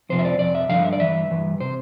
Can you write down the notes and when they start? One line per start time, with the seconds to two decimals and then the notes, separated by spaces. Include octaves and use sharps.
0.09 F2 C3 F3 C5
0.19 E5
0.25 D5
0.39 F2 C3 D5
0.55 E5
0.69 G2 D3 F3 F5
0.85 E5
0.93 D5
1.00 G2 E3 E5
1.30 G2 E3
1.60 C3 C5